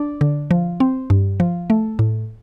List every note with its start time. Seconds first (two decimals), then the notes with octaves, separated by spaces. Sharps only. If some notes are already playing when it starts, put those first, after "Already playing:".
Already playing: D4
0.21 D3
0.51 F3
0.80 C4
1.10 G2
1.40 F3
1.70 A3
1.99 A2